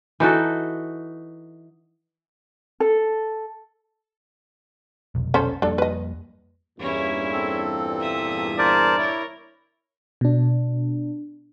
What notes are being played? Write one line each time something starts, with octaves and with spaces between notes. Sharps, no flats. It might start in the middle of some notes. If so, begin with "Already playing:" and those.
E3 D#4 F#4 A4
A4
F1 B1
C#4 A4 C5
F2 G3 A#3 D4 A4
B4 D#5
E2 G2 A#2 C#4 E4
C4 A4
E5 D#6
A#4 C5 D5 A5
E4 A#4 C#5
B2 D4